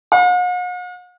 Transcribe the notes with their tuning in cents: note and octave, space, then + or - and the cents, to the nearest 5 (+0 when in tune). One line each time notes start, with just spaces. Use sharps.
F#5 -45